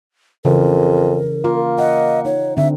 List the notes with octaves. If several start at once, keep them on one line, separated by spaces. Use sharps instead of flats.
F2 C#3 E3 A#4
A#3 F4
D#5 F#5
D#4 C#5
D3 C4 E5